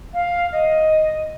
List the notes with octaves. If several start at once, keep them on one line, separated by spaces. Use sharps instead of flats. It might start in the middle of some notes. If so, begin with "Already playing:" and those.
F5
D#5